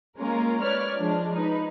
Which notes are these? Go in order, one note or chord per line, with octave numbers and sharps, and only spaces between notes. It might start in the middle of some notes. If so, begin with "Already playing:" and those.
G#3 A#3 C#4 F4 A#4
B4 C#5 D5 F6
F3 G#3 D4
D#4 B4